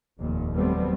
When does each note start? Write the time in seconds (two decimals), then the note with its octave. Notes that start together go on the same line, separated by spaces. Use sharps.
0.18 F1 D#2 A#2
0.52 D#2 F#3 G3 A3 B3 C4